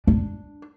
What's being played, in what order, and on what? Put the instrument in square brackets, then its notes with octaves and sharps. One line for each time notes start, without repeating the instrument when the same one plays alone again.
[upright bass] D4